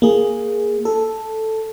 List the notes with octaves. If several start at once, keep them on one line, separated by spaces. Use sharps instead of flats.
A#3 G#4
A4